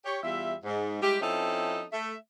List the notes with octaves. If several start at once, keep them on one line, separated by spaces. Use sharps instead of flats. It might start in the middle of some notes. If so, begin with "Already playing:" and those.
G4 C#5
E2 G3 F4 E5
G#2
G3 G#3 E4 G4
F3 C4 C#4 D#4 E4 A4
A3 E5